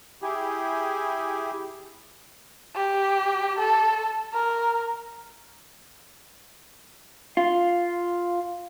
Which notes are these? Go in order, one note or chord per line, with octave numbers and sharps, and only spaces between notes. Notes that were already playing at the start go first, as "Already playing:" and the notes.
E4 G4 G#4
G4
A4
A#4
F4